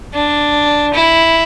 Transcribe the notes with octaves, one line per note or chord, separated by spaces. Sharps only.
D4
E4